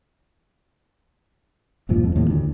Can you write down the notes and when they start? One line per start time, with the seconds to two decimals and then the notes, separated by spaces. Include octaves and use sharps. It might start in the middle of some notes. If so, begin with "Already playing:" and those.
1.89 E1 G2 A#2 F3
2.04 F2
2.16 D#2 A2
2.30 D2